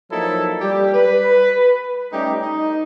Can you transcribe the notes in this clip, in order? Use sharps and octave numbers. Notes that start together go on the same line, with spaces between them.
F3 F#3 A#3 D#4 E4 A4
G3 G4
B4
G3 A3 C#4 D#4 G4
D#4